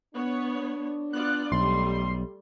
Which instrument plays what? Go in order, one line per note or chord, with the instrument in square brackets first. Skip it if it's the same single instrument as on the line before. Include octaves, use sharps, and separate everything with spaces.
[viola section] B3 C#5 [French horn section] D4
[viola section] B3 F4 D5 [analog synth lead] F#6
[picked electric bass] B1 [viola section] G3 A3 [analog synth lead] C6